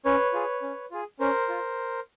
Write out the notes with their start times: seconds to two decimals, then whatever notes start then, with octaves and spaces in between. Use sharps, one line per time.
0.05 C#4 B4 C#5
0.33 F4 G#4
0.62 C#4
0.91 F4 G#4
1.20 C#4 A#4 C5
1.49 F4